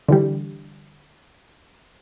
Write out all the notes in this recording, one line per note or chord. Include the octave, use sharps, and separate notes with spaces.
D3 E3 G3